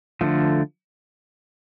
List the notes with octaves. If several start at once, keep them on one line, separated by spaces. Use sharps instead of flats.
D3 F3 A3